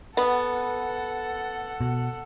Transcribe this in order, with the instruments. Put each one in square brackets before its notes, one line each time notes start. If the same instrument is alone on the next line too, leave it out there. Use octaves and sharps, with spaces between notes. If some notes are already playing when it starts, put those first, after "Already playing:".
[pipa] B3 [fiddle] A4 F#5
[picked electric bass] B2